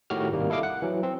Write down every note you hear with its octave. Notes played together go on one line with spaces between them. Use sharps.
A2 D#3 F#4 G4 F6
G#1 C3 D#3 G3 A#3
E4 A4 D#5 F5 D6
F#5
E3 F#3
C4